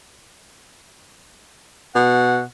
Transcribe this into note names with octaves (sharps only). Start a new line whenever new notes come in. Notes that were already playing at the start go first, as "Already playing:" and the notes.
B2 F#5